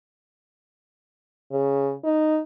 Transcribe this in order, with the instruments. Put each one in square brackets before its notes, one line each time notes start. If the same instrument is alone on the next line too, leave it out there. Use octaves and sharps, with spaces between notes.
[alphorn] C#3
D#4